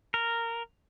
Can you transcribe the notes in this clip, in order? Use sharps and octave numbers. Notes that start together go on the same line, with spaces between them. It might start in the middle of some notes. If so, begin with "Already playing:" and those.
A#4